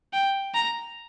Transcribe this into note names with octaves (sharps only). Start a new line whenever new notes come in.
G5
A#5